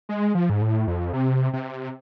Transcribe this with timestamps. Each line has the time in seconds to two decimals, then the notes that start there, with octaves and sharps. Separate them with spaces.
0.09 G#3
0.35 F3
0.50 G#2
0.62 A2
0.87 F2
1.13 C3
1.53 C3